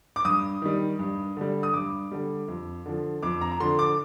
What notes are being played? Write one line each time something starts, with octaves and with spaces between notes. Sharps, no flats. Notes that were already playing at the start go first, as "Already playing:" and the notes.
D6
G2 D#6
D#3 G3
G2
D3 G3
D#6
G2 D6
D3 G3
F2
D3 F3
F2 D6
A#5
A#5
D3 F3 C6
D6